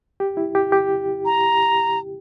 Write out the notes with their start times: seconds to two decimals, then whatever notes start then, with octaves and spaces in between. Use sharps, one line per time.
0.20 G4
0.37 E4
0.55 G4
0.72 G4
1.25 A#5